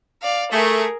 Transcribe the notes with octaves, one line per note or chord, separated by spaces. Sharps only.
D5 F5
A3 G#4 A#4